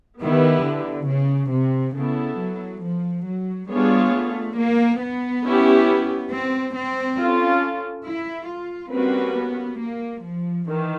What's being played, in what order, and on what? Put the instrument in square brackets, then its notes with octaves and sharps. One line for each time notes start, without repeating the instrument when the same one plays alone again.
[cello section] D#3 [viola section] B3 E4 G4 B4
[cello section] D3
C#3
C3
[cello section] C#3 [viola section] B3 E4 A4
[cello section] F#3
F3
F#3
[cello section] G3 [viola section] B3 D4 F4 G#4 C#5
[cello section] A3
A#3
B3
[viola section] C#4 E4 G4
[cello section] C4
C4
[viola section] C#4 F4 A4
[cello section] E4
F4
[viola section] G3 A#3 C#4 F#4 B4 [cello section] C4
[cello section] B3
A#3
F3
[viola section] D#3 [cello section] E3